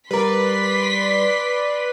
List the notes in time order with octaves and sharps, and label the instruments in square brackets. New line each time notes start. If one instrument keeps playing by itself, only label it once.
[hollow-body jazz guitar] G3 A#4 [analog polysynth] B4 D5 [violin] C6 B6